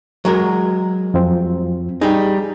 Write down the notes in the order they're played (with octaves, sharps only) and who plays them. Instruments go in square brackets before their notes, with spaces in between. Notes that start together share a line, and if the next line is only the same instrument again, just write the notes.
[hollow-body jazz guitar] F#3 G#3 A#4
[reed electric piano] F2 F3 C4
[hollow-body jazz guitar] G3 D#4 [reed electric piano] G#4